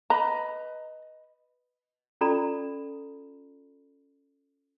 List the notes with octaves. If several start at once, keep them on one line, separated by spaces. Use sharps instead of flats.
B4 D#5 A#5 B5
C#4 F4 A4 D5 A#5 B5